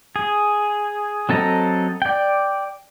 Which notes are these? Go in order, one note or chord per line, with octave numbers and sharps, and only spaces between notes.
G#4
F#3 C4 A4 D#5 A#5
D5 G5